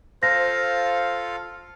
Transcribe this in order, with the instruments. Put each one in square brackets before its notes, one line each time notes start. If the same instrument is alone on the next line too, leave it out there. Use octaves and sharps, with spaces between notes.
[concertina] F4 A4 F5 [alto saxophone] C5 [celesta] A#6